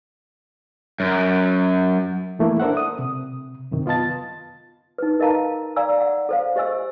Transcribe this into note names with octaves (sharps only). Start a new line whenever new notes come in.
F#2
E3 A3 A#3 E4
D4 A4 A#4 C5 E5 F#5
D#6
C3
F#2 C3 D#3
B3 F4 D#5 A5 A6
D#4 B4
A#4 D#5 F5 A5 A#5
D5 F5 G#5 A#5 E6
F#5
A4 C5 F5
G4 C5 D#5 G#5 E6